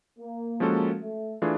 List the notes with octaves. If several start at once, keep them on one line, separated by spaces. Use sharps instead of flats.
A#3
F3 G#3 C#4 F#4 A4
A3
E3 A3 D4 F4 G#4